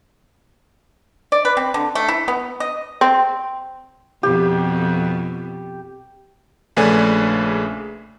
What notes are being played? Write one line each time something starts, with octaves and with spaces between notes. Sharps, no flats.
D5
B4
C4
D3
A3
E4
B3
D#5
C4
F2 B2 G4
A#1 C#3 A3 B4 D5 G#5